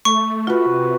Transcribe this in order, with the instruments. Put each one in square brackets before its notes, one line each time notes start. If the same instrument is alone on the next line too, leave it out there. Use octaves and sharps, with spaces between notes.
[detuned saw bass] A3 [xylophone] C#6
[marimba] F4 [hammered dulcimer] F#4 B4
[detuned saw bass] C3